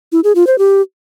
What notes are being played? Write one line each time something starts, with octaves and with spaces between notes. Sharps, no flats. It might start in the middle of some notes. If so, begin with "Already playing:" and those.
E4
G#4
F4
C5
G4